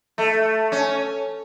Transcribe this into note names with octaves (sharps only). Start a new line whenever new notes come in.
A3
C#4